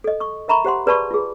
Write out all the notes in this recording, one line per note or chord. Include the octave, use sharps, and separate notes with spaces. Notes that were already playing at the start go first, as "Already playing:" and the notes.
A4 D#5
C#6 D#6
A#4 E5 A#5 B5 C#6
G4 C5 F#5 C6
G#4 B4 D5 A5 B5 C#6
F4 G#4